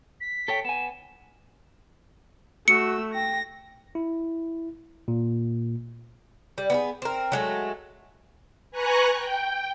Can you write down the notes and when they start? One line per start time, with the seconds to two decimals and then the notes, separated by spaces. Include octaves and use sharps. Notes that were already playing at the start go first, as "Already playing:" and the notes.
0.21 B6
0.48 A4 C#5 G5
0.65 B3 G#5 E7
2.68 A3 F#4 E6 C#7
3.14 G5 A#6
3.95 E4
5.08 A#2
6.58 G3
6.70 B3 E4 G#4
7.02 C4 A#4
7.32 F#3 G#3 A3
8.71 B4 G#5 A#5 C#6 F#6
9.13 G5